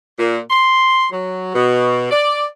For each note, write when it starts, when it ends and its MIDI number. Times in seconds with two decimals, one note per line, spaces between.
0.19 0.39 46
0.50 1.06 84
1.12 1.54 54
1.54 2.10 47
2.11 2.45 74